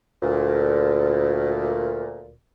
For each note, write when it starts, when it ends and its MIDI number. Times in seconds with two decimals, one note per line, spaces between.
0.22 2.33 38
0.22 2.33 46